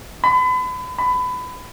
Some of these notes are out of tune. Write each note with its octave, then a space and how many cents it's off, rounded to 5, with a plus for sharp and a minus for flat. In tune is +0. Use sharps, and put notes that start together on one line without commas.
B5 +35
B5 +25